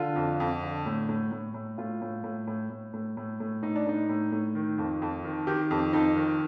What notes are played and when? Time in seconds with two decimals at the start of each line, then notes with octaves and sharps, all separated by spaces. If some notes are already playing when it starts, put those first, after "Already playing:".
Already playing: D3 F4
0.16 F2
0.40 F2
0.63 D3
0.86 A2
1.09 A2
1.32 A2
1.54 A2
1.78 A2 F4
2.02 A2
2.24 A2
2.47 A2
2.70 A2
2.94 A2
3.17 A2
3.40 A2
3.63 A2 D#4
3.76 D4
3.86 A2 D#4
4.09 A2
4.32 A2
4.55 D#3
4.78 F2
5.02 F2
5.25 D#3
5.47 D#3 G4
5.71 F2
5.93 F2 D#4
6.16 D#3